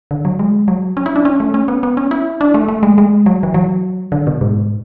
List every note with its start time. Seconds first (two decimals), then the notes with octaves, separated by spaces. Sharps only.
0.11 D3
0.25 F#3
0.39 G#3
0.68 F#3
0.97 C#4
1.06 E4
1.16 D4
1.25 C#4
1.40 A3
1.54 C#4
1.68 B3
1.83 B3
1.97 C#4
2.11 E4
2.41 D4
2.54 A3
2.68 A3
2.83 G#3
2.98 G#3
3.26 F#3
3.43 E3
3.54 F#3
4.12 D3
4.27 B2
4.41 G#2